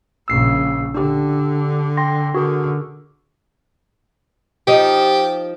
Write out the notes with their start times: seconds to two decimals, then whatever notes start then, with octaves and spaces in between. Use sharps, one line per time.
0.28 A#1 C#3 E6 C7
0.95 D3 D4 G4
1.97 G5 C6 A#6
2.34 D3 F#4 G#4 A#4
4.67 F3 D#4 G4